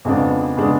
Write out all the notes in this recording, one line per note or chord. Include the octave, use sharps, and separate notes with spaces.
F2 C#3 G#3 B3 D4
C#3 G#3 B3 D4